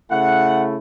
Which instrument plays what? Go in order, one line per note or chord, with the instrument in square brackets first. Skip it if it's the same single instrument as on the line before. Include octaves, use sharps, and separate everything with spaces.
[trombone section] C#3 A3 E4 [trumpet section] F#5